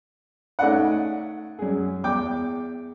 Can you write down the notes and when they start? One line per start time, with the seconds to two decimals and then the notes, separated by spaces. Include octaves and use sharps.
0.59 A3 C#4 D#4 D5 F#5
1.59 F#2 G#4
2.04 E2 G5 D6